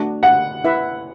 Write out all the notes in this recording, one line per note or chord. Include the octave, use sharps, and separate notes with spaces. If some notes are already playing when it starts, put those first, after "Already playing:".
Already playing: A3 D4 F#4
F#5
E4 B4 E5